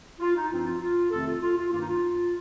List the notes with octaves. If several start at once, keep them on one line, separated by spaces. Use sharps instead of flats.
F4
D#4
G2 F3 C4 F4
F4
F4
F2 C3 D#3 A3 C4 F4 A4
F4
F4
F4
G2 D#3 A#3 F4
D#4
F4